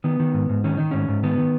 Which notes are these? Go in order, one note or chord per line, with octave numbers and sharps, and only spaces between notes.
D#3 B3
D#3
G#2
G#2
D#3 C#4
D#3 D#4
G#2 C#4
G#2
D#3 B3
D#3